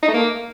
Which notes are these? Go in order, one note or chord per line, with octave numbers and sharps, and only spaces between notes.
D#4
A3
A#3